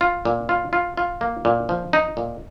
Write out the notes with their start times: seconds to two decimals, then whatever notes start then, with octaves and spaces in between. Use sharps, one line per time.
0.01 F4
0.25 A#2
0.49 F4
0.73 F4
0.97 F4
1.21 A#3
1.45 A#2
1.69 F3
1.93 D#4
2.17 A#2